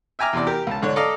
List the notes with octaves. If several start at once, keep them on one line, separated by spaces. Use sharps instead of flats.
E5 G5 G#5 A#5 D6 F6
E2 C3 D5
G4 A#4
C#2 A5
G#2 D3 D4 C#5
A4 D5 D#5 F5 A#5